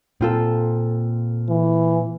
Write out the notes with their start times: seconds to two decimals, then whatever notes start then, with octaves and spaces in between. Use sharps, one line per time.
0.21 A#2 C4 F4 A4
1.49 E3